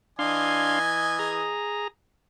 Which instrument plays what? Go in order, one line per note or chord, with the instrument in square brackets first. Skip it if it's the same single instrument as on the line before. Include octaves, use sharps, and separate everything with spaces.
[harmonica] E3 D#5 G#5 [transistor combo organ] D4 F5 C6
[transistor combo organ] G#4 A#5